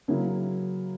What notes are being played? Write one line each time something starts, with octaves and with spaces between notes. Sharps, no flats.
C#3 F#3 A#3 C#4 E4